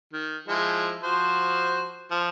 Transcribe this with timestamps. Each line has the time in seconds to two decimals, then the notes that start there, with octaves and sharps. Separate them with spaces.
0.13 D#3
0.48 F3 G#3 E4
1.03 F3 F#4 C5
2.11 F3